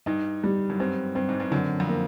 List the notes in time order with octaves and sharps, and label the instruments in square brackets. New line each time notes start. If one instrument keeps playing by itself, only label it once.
[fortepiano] G2 [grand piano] D#4
[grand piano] G3
[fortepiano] F#2
[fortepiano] G2 [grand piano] C4
[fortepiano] G2 [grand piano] C4
[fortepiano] G#2
G2
[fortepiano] F#2 [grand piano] D3
[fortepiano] F2
[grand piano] A#3